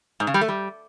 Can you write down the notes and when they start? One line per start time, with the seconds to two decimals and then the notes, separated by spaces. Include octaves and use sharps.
0.20 G#2
0.27 C#3
0.34 G3
0.41 A3
0.48 G3